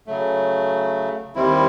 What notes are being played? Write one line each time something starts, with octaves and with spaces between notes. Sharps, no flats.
C#3 F#3 A3
D#2 D#3 G3 C4 E4